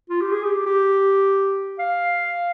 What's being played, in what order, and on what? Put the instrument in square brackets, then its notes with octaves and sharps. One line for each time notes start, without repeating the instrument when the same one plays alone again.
[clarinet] F4
G4
G#4
G4
G4
F5